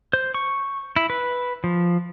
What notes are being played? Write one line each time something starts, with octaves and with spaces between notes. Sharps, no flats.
C5
C#6
E4
B4
F3